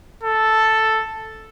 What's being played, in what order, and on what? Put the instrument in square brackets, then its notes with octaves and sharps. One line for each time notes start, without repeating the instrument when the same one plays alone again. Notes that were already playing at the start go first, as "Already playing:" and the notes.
[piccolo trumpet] A4